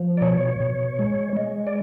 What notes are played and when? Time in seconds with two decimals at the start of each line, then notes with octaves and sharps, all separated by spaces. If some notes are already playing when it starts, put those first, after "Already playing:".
Already playing: F3
0.17 D5
0.22 B2 C#5
0.60 B2
0.99 G#3
1.37 G#3
1.67 D5